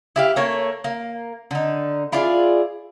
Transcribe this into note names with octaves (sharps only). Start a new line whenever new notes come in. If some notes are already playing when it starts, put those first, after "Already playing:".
E4 G4 F5
A3 A#3 C#5
A#3
D3 D#4
E4 F4 G#4 D5